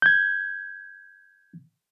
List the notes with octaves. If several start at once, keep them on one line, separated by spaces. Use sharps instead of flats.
G6 G#6